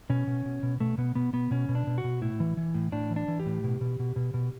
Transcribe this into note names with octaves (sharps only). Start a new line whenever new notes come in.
B2 C#4
B2
B2
B2
B2 A3
B2 B3
B2 B3
B2 B3
B2 C#4
B2
D4
B2
F#4
B2
A2 E4
E3
E3
A2
A2 D4
E3
D4
E3
G4
A2
B2
B2
B2
B2
B2